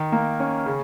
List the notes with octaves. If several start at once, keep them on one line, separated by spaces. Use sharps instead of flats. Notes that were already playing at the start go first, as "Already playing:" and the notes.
Already playing: D#3
A#3
C#4
C#3